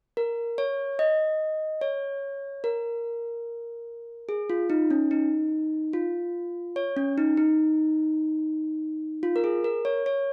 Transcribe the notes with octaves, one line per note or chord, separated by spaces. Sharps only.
A#4
C#5
D#5
C#5
A#4
G#4
F4
D#4
C#4
D#4
F4
C#5
C#4
D#4
D#4
F4
A#4
G#4
A#4
C#5
C#5